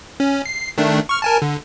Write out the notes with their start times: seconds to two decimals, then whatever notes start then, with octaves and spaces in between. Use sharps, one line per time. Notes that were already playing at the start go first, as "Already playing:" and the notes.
0.20 C#4
0.46 C7
0.78 D#3 A3 D4
1.09 C#6 F6
1.22 A#4 G#5 A5
1.42 D3